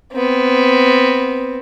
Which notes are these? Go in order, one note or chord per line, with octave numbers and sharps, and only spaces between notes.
B3 C4